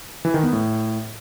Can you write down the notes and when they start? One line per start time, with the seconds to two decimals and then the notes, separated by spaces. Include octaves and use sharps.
0.25 E3
0.34 D#3
0.43 B3
0.53 A2